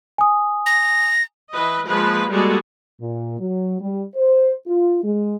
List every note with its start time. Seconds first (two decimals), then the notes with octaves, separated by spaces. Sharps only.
0.18 G#5 D#6
0.66 A#6
1.52 E3 B4 D#5
1.87 F3 G#3 A#3 B4
2.30 G3 G#3 A#3 F#4 G#4 A4
3.01 A#2
3.39 F#3
3.80 G3
4.15 C5
4.67 F4
5.04 G#3